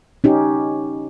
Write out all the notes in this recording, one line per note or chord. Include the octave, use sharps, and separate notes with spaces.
C#4 D#4 G4